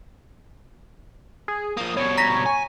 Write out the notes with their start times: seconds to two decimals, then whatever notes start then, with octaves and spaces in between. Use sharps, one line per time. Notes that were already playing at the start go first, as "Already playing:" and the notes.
1.48 G#4
1.77 F3 A#3 D#6
1.97 B2 G3 C#5
2.18 A#5 A#6 B6
2.45 G#5